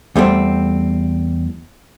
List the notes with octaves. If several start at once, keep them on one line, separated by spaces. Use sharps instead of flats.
E2 G3 A3 C4